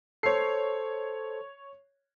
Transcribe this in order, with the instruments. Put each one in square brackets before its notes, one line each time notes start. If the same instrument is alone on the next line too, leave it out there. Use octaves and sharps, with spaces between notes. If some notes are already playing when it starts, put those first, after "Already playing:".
[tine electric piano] A4 C5 [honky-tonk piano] C#5 C7